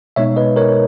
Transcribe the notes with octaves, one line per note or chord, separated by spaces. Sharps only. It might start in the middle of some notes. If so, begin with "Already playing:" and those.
B2 G#3 B3 D#4 C#5 E5
B4 D#5
A#4 C#5